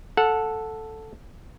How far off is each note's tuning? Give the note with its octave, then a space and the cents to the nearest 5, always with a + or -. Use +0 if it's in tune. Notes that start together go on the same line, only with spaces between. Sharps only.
A4 +0 F#5 -20